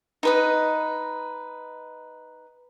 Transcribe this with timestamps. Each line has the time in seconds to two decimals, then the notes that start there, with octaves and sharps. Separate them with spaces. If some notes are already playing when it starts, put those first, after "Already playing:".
0.23 D#4 B4 D#5